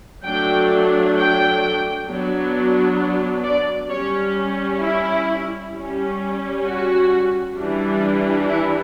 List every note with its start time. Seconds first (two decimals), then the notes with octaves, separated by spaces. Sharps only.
0.23 F#3 A3 D4 G5
1.15 G5
2.07 F#3 B3 D4
3.43 D5
3.89 G3 C#4 C#5
4.81 E4
5.73 G3 C#4
6.64 F#4
7.56 E3 G3 D4
8.47 E4